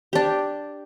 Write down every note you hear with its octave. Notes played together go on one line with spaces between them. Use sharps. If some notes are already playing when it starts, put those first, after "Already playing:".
D4 G4